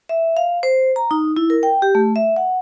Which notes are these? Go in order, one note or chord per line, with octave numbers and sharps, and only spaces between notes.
E5
F5
C5
A#5
D#4
E4
A#4
G5
G4
A3
E5
F#5